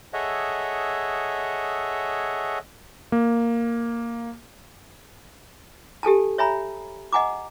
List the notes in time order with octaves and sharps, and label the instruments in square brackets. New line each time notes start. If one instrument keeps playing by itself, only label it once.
[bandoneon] G#4 A4 C#5 D#5 E5 F#5
[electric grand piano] A#3
[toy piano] G4 A4 G#5 A5
C#5 E5 G#5 A#5 B5
D#5 F#5 G#5 A#5 D6